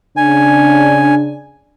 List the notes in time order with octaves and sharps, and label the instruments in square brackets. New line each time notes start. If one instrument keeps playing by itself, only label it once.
[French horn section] C#3 D4 [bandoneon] G#5